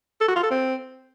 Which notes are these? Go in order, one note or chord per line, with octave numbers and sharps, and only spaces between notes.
A4
F#4
F4
A4
C4